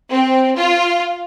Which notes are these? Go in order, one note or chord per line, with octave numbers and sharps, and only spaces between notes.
C4
F4